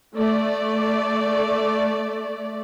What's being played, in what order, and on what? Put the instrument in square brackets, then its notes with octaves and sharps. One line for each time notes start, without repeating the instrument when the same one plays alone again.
[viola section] A3 D5